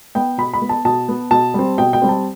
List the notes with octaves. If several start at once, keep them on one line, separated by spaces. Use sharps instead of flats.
B3 G5
B2 B5
B5
B3
A5
B2 A5
B3
B2 A5
G3 C4
B2 G5
G5
G3 C4
A5